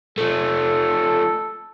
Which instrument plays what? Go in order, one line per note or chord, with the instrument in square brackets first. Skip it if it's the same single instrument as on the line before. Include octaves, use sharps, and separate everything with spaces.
[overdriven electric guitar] F3 A3 [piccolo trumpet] A4